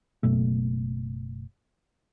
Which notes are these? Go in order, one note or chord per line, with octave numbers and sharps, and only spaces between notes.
F#1 F#2 B2 A3